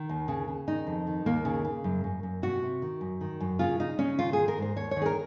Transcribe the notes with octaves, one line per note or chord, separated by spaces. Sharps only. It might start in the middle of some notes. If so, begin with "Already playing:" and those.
Already playing: D#3
D#2
C#3
C#3
D#3 D#4
F2
D#3
D#2 A#3
C#3
C#3
F#2
F#2
F#2
C3 F#4
C3
D#3
F#2
D#3
F#2
C#3 F4
C#3 D#4
C#3 C#4
D#3 F4
D#3 G#4
A#4
G#2 C5
D#2 C#5
C#5
D#3
G#4
A#4